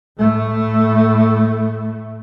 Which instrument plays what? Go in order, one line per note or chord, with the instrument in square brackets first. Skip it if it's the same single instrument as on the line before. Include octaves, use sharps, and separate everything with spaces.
[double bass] A2 A3